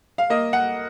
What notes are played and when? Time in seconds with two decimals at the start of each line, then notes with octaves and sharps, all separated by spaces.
0.18 F5
0.30 A#3 D#5
0.53 F#5